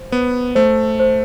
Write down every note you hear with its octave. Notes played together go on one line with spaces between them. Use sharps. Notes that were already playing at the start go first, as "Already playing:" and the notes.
Already playing: C5
B3 C5
A3 C5
C5